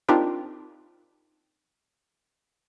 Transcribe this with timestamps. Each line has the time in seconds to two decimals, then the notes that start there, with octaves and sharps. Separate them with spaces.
0.09 C4 D4 D#4 F4 G4 A#4